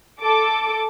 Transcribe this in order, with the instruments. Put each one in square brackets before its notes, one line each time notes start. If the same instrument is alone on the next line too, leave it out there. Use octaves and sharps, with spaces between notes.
[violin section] A4 D6